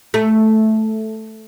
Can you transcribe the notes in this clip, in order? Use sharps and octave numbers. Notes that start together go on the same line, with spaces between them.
A3